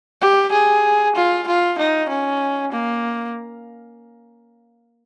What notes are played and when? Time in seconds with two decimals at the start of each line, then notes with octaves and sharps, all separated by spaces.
0.21 G4
0.51 G#4
1.15 F4
1.47 F4
1.78 D#4
2.08 C#4
2.72 A#3